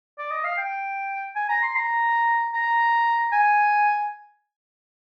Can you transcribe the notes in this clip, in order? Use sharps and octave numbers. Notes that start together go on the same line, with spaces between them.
D5
D#5
F5
G5
G#5
A#5
C6
A#5
A#5
G#5